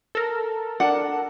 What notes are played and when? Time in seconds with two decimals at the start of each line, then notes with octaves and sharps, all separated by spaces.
0.15 A4 A#4
0.80 D4 F#5